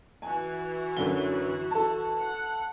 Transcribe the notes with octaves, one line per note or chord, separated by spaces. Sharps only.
E3 F#4 G#5
F#2 D3 G7
A4 A5
F#5